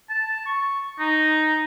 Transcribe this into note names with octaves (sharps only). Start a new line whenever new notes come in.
A5
C#6
D#4